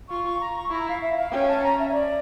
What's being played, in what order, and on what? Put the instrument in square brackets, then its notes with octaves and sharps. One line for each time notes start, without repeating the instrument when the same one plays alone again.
[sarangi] F4 [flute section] C#6
[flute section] C#6
A#5
C#6
[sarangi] E4 [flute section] A#5
[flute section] F5
E5
F5
[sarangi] C#4 [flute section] G5
[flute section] A5
A#5
E5
C#5
D5